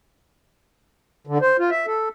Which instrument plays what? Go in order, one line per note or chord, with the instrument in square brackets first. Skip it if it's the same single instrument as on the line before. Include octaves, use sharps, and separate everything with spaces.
[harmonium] D3
C5
F4
E5
A4